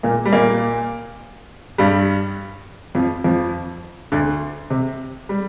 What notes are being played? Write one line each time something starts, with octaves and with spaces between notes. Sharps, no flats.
A#2 A#3
G3
A#2 A#3
G2 G3
F2 F3
F2 F3
D2 D3
C3
G3